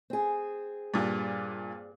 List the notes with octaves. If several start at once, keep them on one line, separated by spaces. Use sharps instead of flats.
C4 G#4
G2 A#2